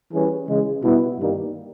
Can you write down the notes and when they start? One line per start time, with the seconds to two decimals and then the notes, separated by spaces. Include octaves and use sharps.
0.12 E3 G3 C#4 G#4 B4
0.47 C#3 E3 G#3
0.82 B2 G3 B3 E4
1.19 G2 D#3 G3 A#3 D#4